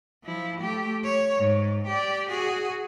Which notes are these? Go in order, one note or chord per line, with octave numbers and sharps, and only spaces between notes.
F3 E4
A3 G4
C#5
G#2
G4 D5
F#4 G#4